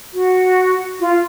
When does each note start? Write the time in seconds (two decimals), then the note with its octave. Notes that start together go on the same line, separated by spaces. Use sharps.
0.13 F#4
1.00 F4